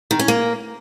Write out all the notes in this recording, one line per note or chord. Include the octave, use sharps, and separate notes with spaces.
D#3
C#4
A#3